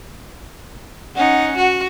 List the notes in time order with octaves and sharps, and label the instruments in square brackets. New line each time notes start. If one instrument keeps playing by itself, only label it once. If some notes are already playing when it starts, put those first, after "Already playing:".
[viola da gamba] C#4 D#4 [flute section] F#5
[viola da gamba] F#4